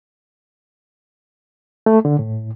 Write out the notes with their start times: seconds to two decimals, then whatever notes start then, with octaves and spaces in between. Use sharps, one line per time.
1.86 A3
2.05 D3
2.19 A2